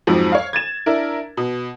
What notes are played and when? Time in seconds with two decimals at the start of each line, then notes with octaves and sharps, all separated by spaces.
0.07 F2 G#2 F3 F#3
0.32 C#5 F5
0.53 G#6 A6 E7
0.86 D4 E4 A#4
1.37 B2